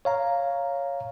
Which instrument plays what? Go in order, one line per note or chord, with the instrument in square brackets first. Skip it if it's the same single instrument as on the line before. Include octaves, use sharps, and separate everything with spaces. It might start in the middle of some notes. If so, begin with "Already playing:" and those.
[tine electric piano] C#5 F5 A#5